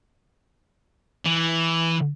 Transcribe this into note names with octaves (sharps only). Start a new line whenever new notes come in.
E3